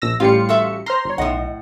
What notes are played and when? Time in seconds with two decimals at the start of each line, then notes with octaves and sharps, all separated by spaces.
0.02 A#1 E6 A#6
0.20 A1 G3 F4 F5 C6 C#7
0.49 F#4 A4 E5
0.86 C5 A#5 C6 F6 A#6
1.05 G1 C#5
1.18 B1 A2 D#5 F#5